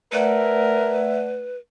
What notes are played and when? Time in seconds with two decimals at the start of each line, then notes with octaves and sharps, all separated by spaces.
0.12 A3 A#4 B4 D5 E5 F#5